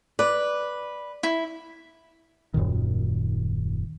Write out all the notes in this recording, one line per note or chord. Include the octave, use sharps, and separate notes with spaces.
B4 D5
E4
D#1 F#2 A#2 D#3